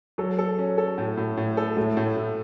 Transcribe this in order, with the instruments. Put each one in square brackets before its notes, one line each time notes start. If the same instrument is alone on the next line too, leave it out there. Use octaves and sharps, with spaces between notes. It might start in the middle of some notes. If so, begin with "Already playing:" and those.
[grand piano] F#3 [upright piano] A4
[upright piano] A4
C#4
A4
A2
A2
A2
A4
[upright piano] A2 [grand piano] A3
[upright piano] A2
A2